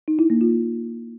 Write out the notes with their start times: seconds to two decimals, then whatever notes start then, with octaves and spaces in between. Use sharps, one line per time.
0.08 D#4
0.19 E4
0.30 A#3
0.41 F4